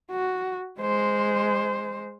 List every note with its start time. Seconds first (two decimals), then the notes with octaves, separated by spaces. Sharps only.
0.11 F#4
0.80 G#3 C5